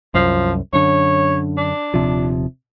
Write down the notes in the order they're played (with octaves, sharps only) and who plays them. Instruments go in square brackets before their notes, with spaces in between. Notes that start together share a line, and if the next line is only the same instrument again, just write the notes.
[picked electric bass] C2 F#2 [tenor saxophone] F3
[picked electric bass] F#2 D3 [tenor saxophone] C#5
[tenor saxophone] D4
[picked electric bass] D#1 C3 F3